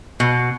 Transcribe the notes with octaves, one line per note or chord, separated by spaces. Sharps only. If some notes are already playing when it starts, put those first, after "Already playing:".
B2